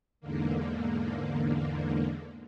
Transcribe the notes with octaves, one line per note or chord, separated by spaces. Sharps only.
E2 G#2 D3 A#3